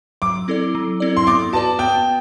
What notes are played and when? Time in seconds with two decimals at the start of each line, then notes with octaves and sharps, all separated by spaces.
0.22 F#3 D6
0.48 C4 E4 A4 D5
0.75 F#3
1.00 C4 E4 A4 D5
1.17 C6
1.27 B3 D6
1.53 F#4 B4 D5 A5
1.79 B3 G5